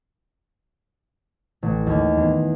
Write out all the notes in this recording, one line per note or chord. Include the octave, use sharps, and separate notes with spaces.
A1
D#2
E2